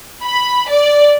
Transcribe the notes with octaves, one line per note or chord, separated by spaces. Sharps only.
B5
D5